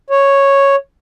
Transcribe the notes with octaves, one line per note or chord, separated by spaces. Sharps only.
C#5